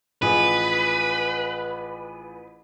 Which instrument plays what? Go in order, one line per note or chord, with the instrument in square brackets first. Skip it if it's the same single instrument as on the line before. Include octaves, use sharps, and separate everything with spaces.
[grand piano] A1 F3 G#4 [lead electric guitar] B4